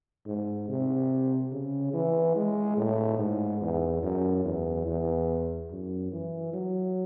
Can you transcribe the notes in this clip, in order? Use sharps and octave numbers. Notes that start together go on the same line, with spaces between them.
G#2
C3
C#3
E3
G#3
A2
G#2
E2
F#2
E2
E2
F#2
E3
F#3